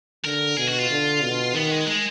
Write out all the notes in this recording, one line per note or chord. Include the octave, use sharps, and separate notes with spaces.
D3 A#4
B2 G#4
F#4
F4
D3
B2
D#3 B3
G#3
G#3